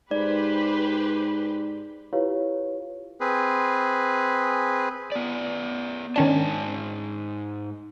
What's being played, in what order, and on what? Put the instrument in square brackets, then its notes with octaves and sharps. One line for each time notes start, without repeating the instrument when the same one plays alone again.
[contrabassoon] G#2 [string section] G4 B4 C5 [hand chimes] D5
[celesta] E4 F4 G4 B4 C#5 F5
[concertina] C4 G#4 B4
[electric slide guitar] B3 D5
[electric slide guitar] G#2 G#5 A5 [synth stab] D#3 C#4 D4